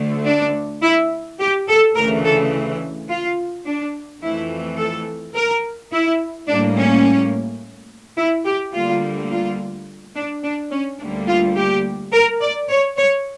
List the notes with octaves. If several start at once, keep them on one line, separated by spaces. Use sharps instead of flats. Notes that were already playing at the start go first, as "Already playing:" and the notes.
Already playing: D2 D3 A3
D4
E4
G4
A4
D2 C#3 E3 A3 A#4
A4
F4
D4
F2 E3 A3 E4
A4
A#4
E4
A2 G3 A#3 D4
C#4
E4
G4
D2 D3 G3 A#3 F4
F4
D4
D4
C#4
D2 D3 G3 A#3 D4
F4
G4
A#4
D5
C#5
C#5